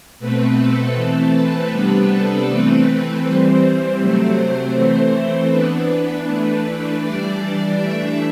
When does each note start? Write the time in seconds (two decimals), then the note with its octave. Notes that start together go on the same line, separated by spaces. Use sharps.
0.19 B2 A3 C4 B4
0.58 A4
0.96 E3 A3 C4 A4
1.34 B4
1.71 C3 G3 B3 D4
2.10 A4
2.48 E3 A3 C4 B4
3.23 E3 G3 C4 C5
3.61 C5
3.99 C3 F#3 A3 C4
4.75 E3 A3 C4 C5
5.51 E3 B3 D4 B4
6.27 E3 A3 D4 B4
7.03 E3 G3 D4 D5
7.79 E3 A3 D4 E5